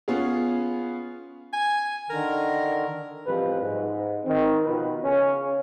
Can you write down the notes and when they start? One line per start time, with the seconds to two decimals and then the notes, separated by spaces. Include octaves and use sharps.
0.08 B3 C#4 F4 G#4
1.53 G#5
2.10 D3 D#3 A#4
3.26 A1 F3 G3 G#3 C4 B4
3.61 G#2
4.25 D#3 C4
4.65 B2 D#3 F3 B4
5.04 C#3 C#4